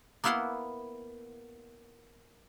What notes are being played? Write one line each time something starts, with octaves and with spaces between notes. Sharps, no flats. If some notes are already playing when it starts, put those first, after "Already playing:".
A#3 B3 E4 F5 F#5 C6